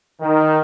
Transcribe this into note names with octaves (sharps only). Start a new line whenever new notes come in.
D#3